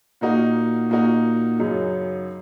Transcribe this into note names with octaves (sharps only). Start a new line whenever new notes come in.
A#2 A#3 D#4 F#4
A#2 A#3 D#4 F#4
F#2 C#3 F#3 D#4 G#4